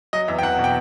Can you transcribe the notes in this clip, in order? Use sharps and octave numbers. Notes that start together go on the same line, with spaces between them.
F#3 D#5
E2 E5
G5
E2 F#5
B2
G5